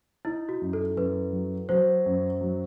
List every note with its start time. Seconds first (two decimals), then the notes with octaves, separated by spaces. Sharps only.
0.25 D#4 E4
0.49 F#4
0.62 F#2
0.73 A4
0.97 F#2 B4
1.33 F#3
1.69 F#3 C5
2.06 F#2
2.41 F#3